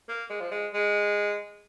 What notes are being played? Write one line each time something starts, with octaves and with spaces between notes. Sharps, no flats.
A#3
G#3
F3
G#3
G#3